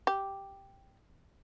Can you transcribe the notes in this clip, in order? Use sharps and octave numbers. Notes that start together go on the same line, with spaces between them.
G4